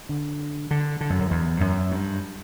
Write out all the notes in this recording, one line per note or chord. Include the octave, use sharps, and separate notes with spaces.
D3
D3
D3
F#2
F#2
E2
F#2
G2